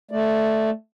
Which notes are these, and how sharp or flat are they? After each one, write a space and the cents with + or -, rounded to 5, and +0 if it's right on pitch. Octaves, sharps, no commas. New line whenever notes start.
A3 +0 D5 +10